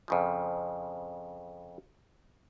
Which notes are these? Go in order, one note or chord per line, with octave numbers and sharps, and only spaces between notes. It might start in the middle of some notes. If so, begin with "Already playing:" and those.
F2 C#3 F3